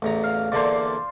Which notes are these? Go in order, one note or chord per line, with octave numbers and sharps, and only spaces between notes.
A1 E2 A#5
F5
E2 D3 A#3 C5 D5